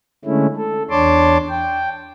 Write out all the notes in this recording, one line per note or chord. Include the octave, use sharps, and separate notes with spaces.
D3 G#3 A3 C#4 E4
A4
E2 D4 C#5 A5 C6 D6
G5